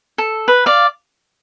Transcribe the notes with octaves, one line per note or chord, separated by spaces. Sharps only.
A4
B4
D5 F5